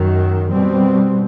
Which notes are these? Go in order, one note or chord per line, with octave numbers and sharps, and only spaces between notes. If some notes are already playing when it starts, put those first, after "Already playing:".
Already playing: F#2 D#3 F#3
B2 G3 C4